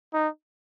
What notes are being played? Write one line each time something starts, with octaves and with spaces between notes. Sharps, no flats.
D#4